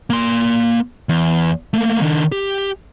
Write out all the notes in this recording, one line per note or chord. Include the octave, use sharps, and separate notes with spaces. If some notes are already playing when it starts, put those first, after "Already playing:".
A#3 C6
E2
A3 A#3
D#3 D4
G4